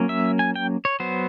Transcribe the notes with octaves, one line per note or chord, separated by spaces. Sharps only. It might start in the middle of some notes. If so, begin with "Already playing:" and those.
Already playing: F#3 A#3 C#4
E5
G#5
G5
C#5
F#3 B3 C5